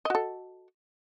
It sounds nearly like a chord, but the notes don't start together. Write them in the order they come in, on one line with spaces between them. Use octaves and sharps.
D#5 F#4 A4